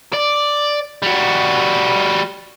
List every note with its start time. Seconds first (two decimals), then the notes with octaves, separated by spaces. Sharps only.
0.14 D5
1.03 G3 F#4